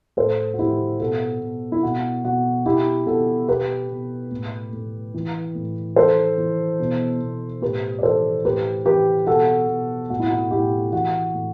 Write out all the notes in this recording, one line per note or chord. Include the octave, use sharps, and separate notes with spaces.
A2 A4 C5
F#4
A2 E4 G4
B2 F#4 A4
B2
E4
B2 F#4
B2 F#4
B2 E4 G4
B2 F#4 A4
B2 G4 B4
B2
A2
A2
E3
A2
E3 A4 C5
E3
B2
B2
A2 G4 B4
D5
E3 A4 C5
A2 G4 B4
E3 G4 B4
B2 F#4 A4
B2
A2 F#4
E4
F#4
A2 E4 G4
E3 F#4
A2